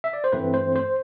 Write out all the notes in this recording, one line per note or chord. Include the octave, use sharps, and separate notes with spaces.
E5
D5
C5
G2 E3 A3 C4 B4
C5
C5